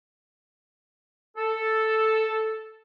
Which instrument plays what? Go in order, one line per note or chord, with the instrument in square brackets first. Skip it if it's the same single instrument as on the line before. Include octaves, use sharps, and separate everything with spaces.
[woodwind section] A4